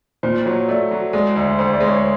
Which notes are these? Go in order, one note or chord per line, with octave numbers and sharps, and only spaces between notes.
A#2 C5
F#3 C#5
A3 D5
F#3
G#3 D5
D2 D5
D2 C5
D5
G#3
C#5